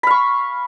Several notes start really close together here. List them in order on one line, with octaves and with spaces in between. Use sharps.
B5 F5 C#6